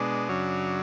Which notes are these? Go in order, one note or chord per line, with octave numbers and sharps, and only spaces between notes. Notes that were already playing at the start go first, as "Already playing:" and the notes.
Already playing: B2 G#3 D4
F#2 C#3 F#3